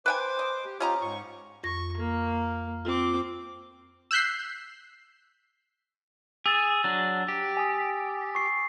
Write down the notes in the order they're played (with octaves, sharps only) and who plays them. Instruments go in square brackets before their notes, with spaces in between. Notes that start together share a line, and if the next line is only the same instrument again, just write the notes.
[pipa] B4 G5 G#5 [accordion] C5 D6
[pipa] D#5
[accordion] G4
[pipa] C#4 D#5 A#5 [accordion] F4 G4
[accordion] G#2 C#6
[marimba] F2 A#6 [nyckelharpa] C#6
[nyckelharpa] A#3
[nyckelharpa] C4 D6 [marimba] F4
[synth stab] E6 F#6 G6 B6 C7
[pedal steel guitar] G#4 [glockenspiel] E6 A6 E7
[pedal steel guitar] F#3 D4 [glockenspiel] A6
[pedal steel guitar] G4
[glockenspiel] G#5 D#6
C#6 C7